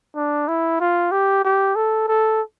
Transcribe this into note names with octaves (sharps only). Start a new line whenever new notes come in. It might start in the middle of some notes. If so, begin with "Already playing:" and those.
D4
E4
F4
G4
G4
A4
A4